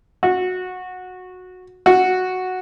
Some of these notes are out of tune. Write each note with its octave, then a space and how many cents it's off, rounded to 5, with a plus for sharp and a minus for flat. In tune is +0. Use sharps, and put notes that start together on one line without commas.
F#4 -15
F#4 -5